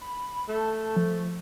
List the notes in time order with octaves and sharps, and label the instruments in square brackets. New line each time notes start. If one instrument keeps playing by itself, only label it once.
[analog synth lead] B5
[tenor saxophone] A3 [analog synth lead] A5
[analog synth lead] F3